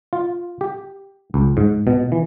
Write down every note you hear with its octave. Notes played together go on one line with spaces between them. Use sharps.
F4
G4
C#2
G#2
B2
E3